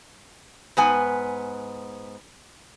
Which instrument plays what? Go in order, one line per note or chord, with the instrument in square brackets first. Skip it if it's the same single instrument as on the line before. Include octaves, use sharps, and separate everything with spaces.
[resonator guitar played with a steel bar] G#2 B3 G#5